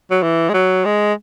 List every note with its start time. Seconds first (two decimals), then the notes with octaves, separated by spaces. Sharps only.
0.11 F#3
0.23 E3
0.49 G#3
0.54 F#3
0.85 G#3